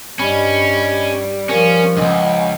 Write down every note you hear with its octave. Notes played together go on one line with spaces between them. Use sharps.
G2 G3 C#4 D#5 B5
F3 C#4 A#4 F5
C#2 G2 D#5 F#5 G#5